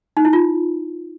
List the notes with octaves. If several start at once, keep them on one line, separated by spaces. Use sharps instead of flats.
D#4
E4
F4